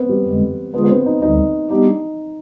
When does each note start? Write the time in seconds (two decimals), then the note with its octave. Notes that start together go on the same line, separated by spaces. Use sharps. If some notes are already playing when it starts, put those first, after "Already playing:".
Already playing: B3 C4
0.09 G3
0.25 F2 D3 G#3
0.74 D3 G#3 B3 D4 F4 G#4
0.84 B3
0.89 C4
1.06 D#4
1.22 D2 D3 G3 D#4
1.70 G3 B3 D4 D#4 G4